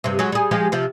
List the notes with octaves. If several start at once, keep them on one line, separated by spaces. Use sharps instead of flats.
G2 C3
F#3 G#3 F#4
G3 G#4
F3 G#3 G4
C3 F3